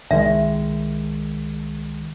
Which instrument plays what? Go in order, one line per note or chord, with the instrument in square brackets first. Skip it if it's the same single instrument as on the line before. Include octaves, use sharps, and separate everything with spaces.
[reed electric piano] C2 D#3 G#3 [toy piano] E5